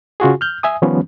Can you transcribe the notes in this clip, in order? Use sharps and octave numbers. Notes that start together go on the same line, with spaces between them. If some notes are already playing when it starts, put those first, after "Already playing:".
C#3 F4 F#4 G#4
F6 G6
E5 G#5 D#6
D#3 F3 G3 B3 C#4